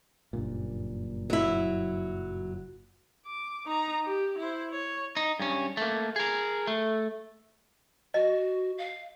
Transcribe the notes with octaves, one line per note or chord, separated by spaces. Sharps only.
F#1 G2 A#2
F#3 E4
D6
D#4 A#5
G4
E4 C5
C#5
D#4
G2 C#4
A3 A#3
G#4 A#4
A3
F#4 D#5
F5